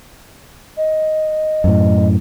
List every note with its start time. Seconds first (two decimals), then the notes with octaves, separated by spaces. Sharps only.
0.76 D#5
1.64 F#2 A2